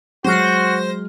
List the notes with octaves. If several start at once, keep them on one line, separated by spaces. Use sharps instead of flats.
F#3 G#3 F#4 C5 F6 A#6